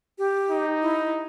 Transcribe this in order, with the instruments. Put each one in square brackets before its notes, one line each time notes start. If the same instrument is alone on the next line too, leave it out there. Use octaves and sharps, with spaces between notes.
[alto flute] G4
[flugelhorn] D#4
[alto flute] E4